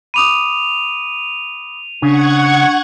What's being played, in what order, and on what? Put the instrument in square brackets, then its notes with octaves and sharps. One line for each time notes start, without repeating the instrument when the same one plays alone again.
[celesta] B5 D6 D#6 [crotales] D#7 F7
[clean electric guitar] C#3 [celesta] D4 [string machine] F#5 C#6 G#6